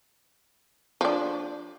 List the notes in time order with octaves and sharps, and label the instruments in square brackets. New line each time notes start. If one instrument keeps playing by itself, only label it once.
[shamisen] F3 D4